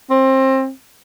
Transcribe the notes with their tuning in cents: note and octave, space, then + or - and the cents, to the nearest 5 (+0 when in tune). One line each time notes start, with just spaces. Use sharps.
C4 +25